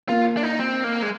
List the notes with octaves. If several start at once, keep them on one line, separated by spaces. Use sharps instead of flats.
A#3 F4
D4
D#4
C4
A#3
G#3